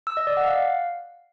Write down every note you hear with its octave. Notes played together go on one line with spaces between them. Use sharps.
E6
D#5
D5
F#5
F5